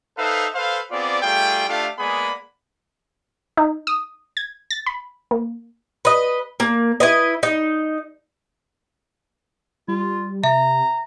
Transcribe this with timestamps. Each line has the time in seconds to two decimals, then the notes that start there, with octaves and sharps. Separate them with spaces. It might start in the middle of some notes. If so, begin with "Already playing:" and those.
0.18 D#4 A4 B4 C5 E5 F5
0.55 A4 B4 C5 F5
0.91 B3 C4 F4 G#4 D5
1.22 G3 A3 F4 G#4 G5
1.68 A3 D4 F4 G4 A4 F5
1.99 G#3 A#3 B3 G#4 D5 B5
3.57 D#4
3.87 D#6
4.37 G#6
4.71 A6
4.86 B5
5.31 A#3
6.05 B4 D#5
6.60 A#3
7.00 E4 B4 D#5
7.43 D#4
9.88 G3 F4
10.44 C3 E5 A#5